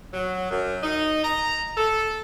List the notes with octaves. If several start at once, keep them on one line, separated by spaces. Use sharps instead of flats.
F#3
F#2
D#4
A#5
A4